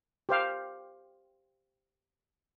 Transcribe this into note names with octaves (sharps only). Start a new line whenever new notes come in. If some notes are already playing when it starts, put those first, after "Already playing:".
G4 C5 F5